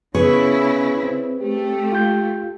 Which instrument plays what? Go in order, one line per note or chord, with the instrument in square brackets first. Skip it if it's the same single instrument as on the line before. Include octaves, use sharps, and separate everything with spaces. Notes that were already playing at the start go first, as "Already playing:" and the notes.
[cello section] C#3 E4 [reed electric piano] B3 C#6 [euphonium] C#4 [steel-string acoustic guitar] G#4 B4 C#5
[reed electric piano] C4
[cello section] A3 [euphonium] G4
[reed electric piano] F4 G6